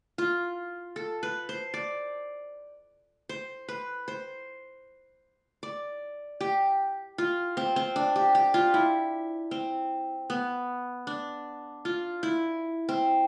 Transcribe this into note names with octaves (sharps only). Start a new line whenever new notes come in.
F4
A4
B4
C5
D5
C5
B4
C5
D5
G4
F4
C4
C4
D4
G4
G4
F4
E4
C4
B3
D4
F4
E4
C4